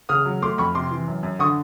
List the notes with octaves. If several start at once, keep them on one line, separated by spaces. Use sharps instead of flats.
C#3 D#6 F6
F#3
A3 C6 D6
F2 B5 C#6
C3 C6 D6
E3
F#2
F#2
D3 C#6 D#6